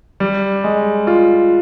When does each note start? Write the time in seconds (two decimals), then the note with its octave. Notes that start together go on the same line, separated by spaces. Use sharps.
0.20 G3
0.64 G#3
1.07 F4